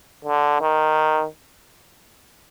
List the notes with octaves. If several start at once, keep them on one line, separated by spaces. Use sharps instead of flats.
D3
D#3